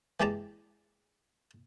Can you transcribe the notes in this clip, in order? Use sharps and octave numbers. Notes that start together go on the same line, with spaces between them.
E3 G#3 G4 D5 A5 A#5